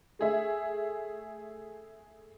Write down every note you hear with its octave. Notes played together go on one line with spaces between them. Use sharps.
A3 G#4 E5